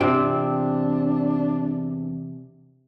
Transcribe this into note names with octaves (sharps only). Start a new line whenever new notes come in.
E2 C3 C4 D4 F4 G5